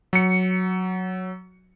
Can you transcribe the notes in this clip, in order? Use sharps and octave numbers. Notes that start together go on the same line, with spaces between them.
F#3 C#7